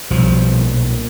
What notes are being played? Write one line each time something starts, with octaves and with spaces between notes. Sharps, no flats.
B1 F3 G3
A#2